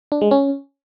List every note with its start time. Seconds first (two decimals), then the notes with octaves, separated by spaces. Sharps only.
0.12 D4
0.21 G#3
0.31 C#4